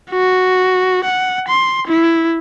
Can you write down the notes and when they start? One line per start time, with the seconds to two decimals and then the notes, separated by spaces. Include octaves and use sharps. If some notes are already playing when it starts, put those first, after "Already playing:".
0.11 F#4
1.05 F#5
1.48 C6
1.88 E4